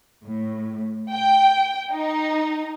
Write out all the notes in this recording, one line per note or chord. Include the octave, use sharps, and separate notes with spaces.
A2
G5
D#4